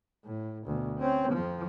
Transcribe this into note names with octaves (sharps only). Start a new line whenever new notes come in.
A2
D2 B2
C4 C#4
F2 F3